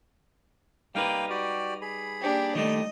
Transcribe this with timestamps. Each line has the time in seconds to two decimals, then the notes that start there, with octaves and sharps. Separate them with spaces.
0.95 G3 A#3 D#4 B4 F5 G5
1.30 F#4 G4 D5
1.81 G#4 B5
2.21 A#3 D4 G4
2.55 D#3 G3 A3 D#5